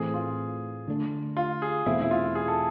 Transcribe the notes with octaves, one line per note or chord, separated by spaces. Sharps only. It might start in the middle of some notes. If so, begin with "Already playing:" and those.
Already playing: A2 E3 A3 C4 G#4
F4
D3 A3 D4
F4
G#4
E2 B2 A3 C4 E4
E4
F4
G#4
A4